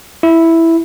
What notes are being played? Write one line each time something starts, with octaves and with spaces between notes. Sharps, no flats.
E4